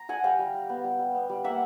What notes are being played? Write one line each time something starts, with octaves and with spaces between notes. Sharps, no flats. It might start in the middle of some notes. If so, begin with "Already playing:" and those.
Already playing: A#5
D4 F#5 G#5
G3 F5 G5
G3
G3
B3
G3
G3
B3
G3
A#3 E5 F#5